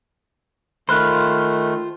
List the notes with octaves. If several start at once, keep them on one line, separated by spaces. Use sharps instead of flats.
D#3 A3 F4 C5 B5 F6 F#6